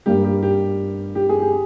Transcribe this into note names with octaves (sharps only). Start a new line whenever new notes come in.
G2 G3 A#3 G4
G4
G4
G4
G#4
G4